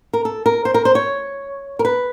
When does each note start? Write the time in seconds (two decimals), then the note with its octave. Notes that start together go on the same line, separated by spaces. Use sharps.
0.13 A#4
0.25 A4
0.46 A#4
0.65 C5
0.74 A#4
0.85 C5
0.95 C#5
1.79 A#4
1.85 B4